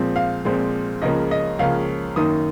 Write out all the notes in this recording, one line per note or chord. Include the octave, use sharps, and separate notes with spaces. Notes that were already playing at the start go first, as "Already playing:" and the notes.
Already playing: A#2 F3 G#3 C4
F5
A#2 F3 G#3 C4
C#2 C#3 F3 A#3 C#4 D#5
D#5
C#2 C#3 F3 A#3 C#4 F5
F#2 D#3 A#3 D#4 D#6